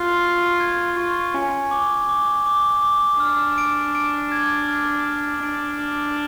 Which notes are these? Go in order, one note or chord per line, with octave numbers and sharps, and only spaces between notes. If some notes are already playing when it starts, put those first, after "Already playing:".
Already playing: F4 F#6
C#6
G#6
F4 C#6
C#4 G#5
D6
D6
D6
D6
D4 F6
D7
D7
G#6
F6
F6
D4 D7
F6